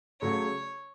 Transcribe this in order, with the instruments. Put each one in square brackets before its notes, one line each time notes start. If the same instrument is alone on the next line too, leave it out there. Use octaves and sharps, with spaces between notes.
[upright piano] C#3 F#3 A3 [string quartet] C#5